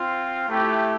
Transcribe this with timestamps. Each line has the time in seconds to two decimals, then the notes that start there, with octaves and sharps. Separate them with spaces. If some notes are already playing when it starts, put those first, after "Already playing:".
Already playing: C4 F4
0.48 A3 E4 G4